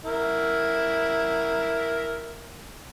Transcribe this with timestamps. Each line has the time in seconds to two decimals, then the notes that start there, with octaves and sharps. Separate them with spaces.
0.05 E4 A#4